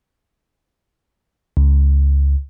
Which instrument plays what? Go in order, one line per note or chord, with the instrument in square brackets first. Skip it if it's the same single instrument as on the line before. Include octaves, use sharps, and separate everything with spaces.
[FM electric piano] C#2